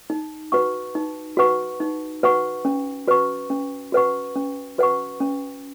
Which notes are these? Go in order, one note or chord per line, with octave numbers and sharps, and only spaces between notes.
D#4
F#4 B4 F#5 C#6
D#4
F#4 B4 F#5 C#6
D#4
F#4 B4 F#5 C#6
C#4
F#4 B4 F#5 C#6
C#4
F#4 B4 F#5 C#6
C#4
F#4 B4 F#5 C#6
C#4